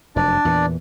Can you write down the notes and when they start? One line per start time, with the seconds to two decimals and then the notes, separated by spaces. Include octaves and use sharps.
0.16 F1 F#2 D4 D5
0.45 E2 A#2 E3